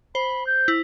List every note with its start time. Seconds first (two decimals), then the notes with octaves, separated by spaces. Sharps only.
0.15 C5 B5
0.47 G6
0.68 E4